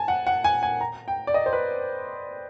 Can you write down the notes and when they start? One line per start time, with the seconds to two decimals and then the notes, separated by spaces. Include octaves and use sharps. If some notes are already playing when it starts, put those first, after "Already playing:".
Already playing: G#5 A5
0.08 F#5
0.27 F#5
0.44 G#5
0.63 G#5
0.81 A#5
1.08 G5
1.27 D5
1.34 D#5
1.46 C5
1.53 B4